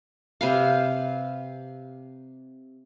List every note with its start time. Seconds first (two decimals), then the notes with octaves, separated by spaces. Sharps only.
0.41 C3 B4 F5